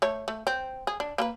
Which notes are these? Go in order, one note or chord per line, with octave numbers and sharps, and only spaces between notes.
A3 C#5
A3
C4
G#4
D4
A#3 A4 B4